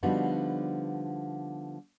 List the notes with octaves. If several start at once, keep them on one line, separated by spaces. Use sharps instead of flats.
D3 F3 G3 B3 D#4 F#4